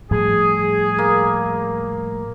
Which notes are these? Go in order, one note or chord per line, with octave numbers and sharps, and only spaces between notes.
A2 F3 G3 G#4
A#3